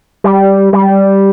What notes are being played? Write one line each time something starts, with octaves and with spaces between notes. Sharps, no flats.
G3
G3